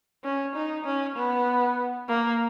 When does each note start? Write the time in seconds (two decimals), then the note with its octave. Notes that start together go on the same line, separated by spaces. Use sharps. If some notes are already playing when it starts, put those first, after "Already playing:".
0.24 C#4
0.55 D#4
0.85 C#4
1.16 B3
2.08 A#3